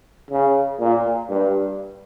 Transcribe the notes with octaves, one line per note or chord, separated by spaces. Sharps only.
C#3
A#2
G2